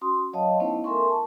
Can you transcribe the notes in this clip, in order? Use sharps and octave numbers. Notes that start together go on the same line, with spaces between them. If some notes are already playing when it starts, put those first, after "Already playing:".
C#4 F#4 C6 D#6
F#3 C#5 D#5 F5 A5
A3 B3 C#4 D#4 E4 C5
A4 A#4 E5 G#5 C6 C#6
A5